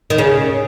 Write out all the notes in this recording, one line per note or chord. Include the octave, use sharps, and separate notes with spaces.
D#3
C#3